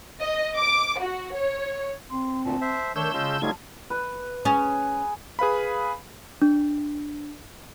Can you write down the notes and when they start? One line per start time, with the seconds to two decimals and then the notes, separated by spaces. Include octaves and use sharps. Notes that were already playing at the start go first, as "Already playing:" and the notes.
0.21 D#5
0.57 D6
1.01 F#4
1.35 C#5
2.10 C4 C6
2.45 D2 A#2 A5
2.61 C5 E5
2.96 D#3 A3 D4 A#4 C#5 E6 G6
3.13 C#3 G#3 C#4 F4 A5
3.42 F#3 G3 A3 D#4 F4 G#6
3.90 B4
4.45 C#4 G#4
5.39 G#4 B4 F5 B5
6.42 D4